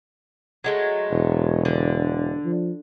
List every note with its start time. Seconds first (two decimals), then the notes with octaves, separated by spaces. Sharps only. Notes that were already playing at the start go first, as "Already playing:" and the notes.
0.64 F#3 G#3 A3
1.11 E1
1.65 D3
2.45 F3